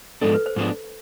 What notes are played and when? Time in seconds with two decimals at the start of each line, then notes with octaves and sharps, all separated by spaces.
0.21 G#2 F3 G#3 B3 D4 A4
0.34 B4
0.46 C5
0.56 G#2 F3 G#3 B3 D4